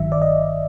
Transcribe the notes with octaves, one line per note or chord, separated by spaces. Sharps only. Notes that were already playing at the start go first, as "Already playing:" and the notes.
Already playing: G1 G2 D#3 F#3 E5
D5
D#5